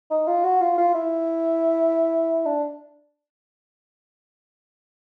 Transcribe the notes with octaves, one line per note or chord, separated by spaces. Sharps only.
D#4
F4
F#4
F4
F4
E4
D4